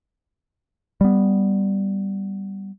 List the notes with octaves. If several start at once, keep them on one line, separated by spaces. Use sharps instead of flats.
G3 B3